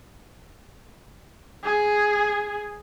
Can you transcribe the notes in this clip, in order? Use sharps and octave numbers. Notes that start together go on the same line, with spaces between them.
G#4